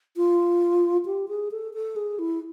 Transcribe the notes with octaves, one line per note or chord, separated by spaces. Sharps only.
F4
G4
G#4
A4
A4
G#4
E4